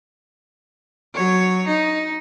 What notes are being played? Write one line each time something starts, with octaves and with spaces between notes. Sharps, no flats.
F#3 C#5
D#4